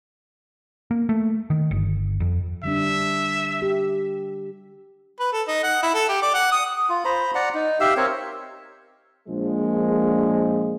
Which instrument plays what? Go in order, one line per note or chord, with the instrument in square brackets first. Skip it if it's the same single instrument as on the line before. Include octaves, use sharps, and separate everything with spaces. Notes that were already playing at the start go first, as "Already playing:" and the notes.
[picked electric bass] A#3
A3
D#3
G1
F2
[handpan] D3 G3 D4 [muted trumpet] E5
[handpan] G4
[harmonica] B4
A4
D#4
F#5
E4
A4
G4
D5
F#5
D#6
[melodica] F4
C5 A#5 B5
D5 F#5 A#5
D#4
G4 E5 F5 E6
C4 A#4 C#5
[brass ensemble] A#1 F3 G#3